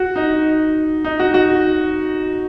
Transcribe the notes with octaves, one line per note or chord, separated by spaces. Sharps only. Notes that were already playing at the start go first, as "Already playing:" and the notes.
Already playing: F#4
D#4
D#4
F#4
F#4